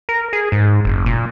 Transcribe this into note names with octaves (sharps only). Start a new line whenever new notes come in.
A#4
G#4
G#2
F#1
A#2